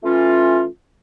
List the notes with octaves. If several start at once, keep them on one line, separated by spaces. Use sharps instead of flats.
E3 A3 C#4 F4